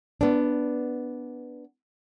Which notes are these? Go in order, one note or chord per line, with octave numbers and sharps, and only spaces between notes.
B3 D4